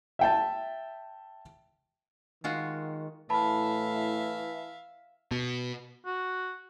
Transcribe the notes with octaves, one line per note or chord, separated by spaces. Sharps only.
E5 G5 A5
D#3 G#3 F4 F#4
A2 E3 E5 F5 A5 B5
B2
F#4